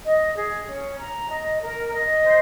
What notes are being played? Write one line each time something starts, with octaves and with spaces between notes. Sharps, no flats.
D#5
G#4
C#4
A#5
D#5
A#4
D#5
C5